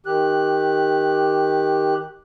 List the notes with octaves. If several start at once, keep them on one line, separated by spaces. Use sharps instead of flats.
D#3 G4 F#6